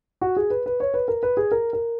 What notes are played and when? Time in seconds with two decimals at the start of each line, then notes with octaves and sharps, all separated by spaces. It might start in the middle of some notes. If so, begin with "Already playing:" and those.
0.21 F#4
0.36 G#4
0.50 B4
0.66 B4
0.80 C#5
0.94 B4
1.08 A#4
1.23 B4
1.37 G#4
1.52 A#4
1.73 A#4